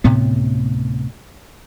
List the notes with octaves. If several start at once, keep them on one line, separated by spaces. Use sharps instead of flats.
D2 A2 C3 B3